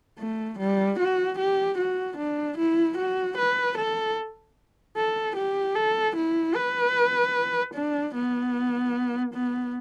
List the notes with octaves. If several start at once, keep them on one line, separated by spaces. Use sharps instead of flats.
A3
G3
F#4
G4
F#4
D4
E4
F#4
B4
A4
A4
G4
A4
E4
B4
D4
B3
B3